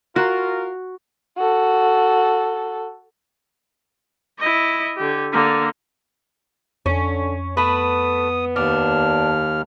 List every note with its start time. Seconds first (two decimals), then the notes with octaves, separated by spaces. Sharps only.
0.16 F4 F#4 A#4
1.38 F#4 A4
4.39 E4 D#5
4.97 D3 G4
5.33 D3 A#3
6.86 F2 D3 C#4
7.57 A3 B3 B4 D#6
8.56 D#2 D4 F6